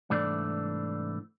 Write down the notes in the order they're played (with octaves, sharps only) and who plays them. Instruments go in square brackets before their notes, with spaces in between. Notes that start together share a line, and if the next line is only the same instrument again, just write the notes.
[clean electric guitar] C2 G#2 E3 A3 D4 D5